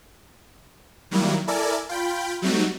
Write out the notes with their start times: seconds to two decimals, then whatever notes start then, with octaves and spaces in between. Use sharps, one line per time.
1.11 D#3 F#3 G3 A#3 E4
1.47 E4 A4 A#4 D5 G#5
1.89 F4 G5 B5
2.42 F#3 G3 A3 C4 D#4 F#4